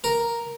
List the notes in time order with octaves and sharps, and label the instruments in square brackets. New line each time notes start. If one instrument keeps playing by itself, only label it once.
[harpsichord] A#4